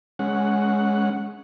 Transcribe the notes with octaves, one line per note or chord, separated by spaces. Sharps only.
G#3 C#4 F#5